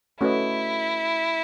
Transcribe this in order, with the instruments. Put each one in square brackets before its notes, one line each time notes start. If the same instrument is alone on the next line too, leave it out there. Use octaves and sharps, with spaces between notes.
[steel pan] A3 C#4 F#4 B4 D#5 [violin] E4